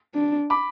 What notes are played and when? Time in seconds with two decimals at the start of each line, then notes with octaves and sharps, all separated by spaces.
0.14 D4
0.50 B5 D6